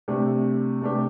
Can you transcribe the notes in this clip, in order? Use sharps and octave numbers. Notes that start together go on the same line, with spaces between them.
C3 A3 D4 G4
C3 A3 D4 G4